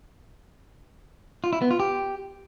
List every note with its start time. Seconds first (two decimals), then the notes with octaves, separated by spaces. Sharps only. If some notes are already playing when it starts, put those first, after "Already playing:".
1.44 F4
1.53 E4
1.62 B3
1.71 F4
1.80 G4